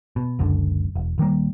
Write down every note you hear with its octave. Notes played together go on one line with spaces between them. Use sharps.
B2
F#1 C#2 F#2 D3
E1
D#1 D#3 G3 A#3